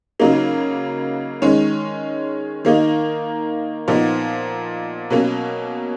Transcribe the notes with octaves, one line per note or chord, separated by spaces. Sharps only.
C#3 F#3 A#3 D#4
D#3 G#3 C#4
D#3 A#3 D#4
A#2 F3 B3 D#4
B2 F#3 A#3 C#4